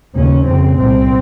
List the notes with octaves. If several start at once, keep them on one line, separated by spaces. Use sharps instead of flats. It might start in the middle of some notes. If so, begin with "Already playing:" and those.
D#2 C#3 C#4
F2 C#3 C4
C2 A#2 C4